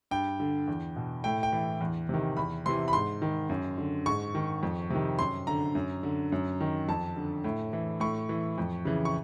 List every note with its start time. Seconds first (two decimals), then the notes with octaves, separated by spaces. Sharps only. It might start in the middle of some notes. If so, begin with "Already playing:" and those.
0.11 G2 G5
0.40 D3
0.68 E2
0.96 B2
1.24 A2 G5
1.43 G5
1.52 E3
1.81 E2
2.09 C3 D#3
2.37 E2 B5
2.66 C3 E3 C6
2.88 B5
2.93 G#2 C6
3.22 D#3
3.49 F#2
3.78 D3
4.06 G#2 C#6
4.35 D#3
4.63 F2
4.90 C3 D#3
5.19 F#2 C6
5.47 D3 A#5
5.75 F#2
6.03 D3
6.32 F#2
6.60 D#3
6.88 F2 A5
7.16 D3
7.44 A2
7.73 E3
8.00 A2 C#6
8.29 E3
8.58 F2
8.85 C#3 E3
9.05 C#6